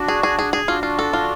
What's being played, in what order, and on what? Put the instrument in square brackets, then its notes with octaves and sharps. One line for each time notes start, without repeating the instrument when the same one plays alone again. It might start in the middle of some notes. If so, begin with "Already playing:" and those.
Already playing: [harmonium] D4 F#4
[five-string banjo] G#4
G#4
G#4
G#4
[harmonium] D4 F#4 [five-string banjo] F4
[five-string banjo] F4
A4
F4